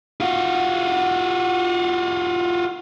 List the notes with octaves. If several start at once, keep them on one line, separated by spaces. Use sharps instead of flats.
F4 F#4